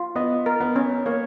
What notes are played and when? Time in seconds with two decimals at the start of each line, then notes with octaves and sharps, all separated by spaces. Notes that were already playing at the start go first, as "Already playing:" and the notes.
Already playing: F4
0.15 B3 D#5
0.46 A#4
0.60 B3
0.76 C#4
1.06 A#3 C#5